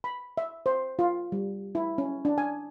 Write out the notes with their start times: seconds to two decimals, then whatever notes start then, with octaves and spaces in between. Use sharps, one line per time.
0.04 B5
0.37 E5
0.66 C5
0.99 F4
1.32 G3
1.75 E4
1.98 C#4
2.25 D4
2.38 G#5